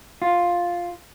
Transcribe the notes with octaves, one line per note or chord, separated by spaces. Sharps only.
F4